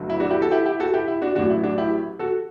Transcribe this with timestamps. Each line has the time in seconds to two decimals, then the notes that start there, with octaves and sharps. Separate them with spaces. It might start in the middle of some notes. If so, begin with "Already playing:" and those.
Already playing: G1 G2 F#3 A3
0.10 E4
0.20 D4 F#4
0.30 E4 G4
0.41 F#4 A4
0.51 E4 G4
0.66 E4 G4
0.80 F#4 A4
0.94 E4 G4
1.08 E4
1.22 D4 F#4
1.35 A1 A2 F#3 D4 F#4
1.50 E4
1.63 D4 F#4
1.78 E4 G4
2.19 F#4 A4